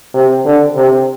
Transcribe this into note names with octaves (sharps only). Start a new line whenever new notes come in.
C3
D3
C3